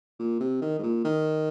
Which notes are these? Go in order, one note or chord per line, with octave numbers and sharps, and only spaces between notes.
A#2
C3
D#3
G#2
A#2
D#3